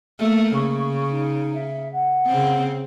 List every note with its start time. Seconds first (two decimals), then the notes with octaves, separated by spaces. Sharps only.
0.20 A3 A#3
0.54 C#3 C#6
1.10 D#4
1.54 E5
1.93 F#5
2.27 C#3 C4